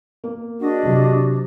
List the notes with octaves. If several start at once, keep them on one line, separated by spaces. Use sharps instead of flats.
A#3
D4 F#4 G#4 D#5
C3 F#3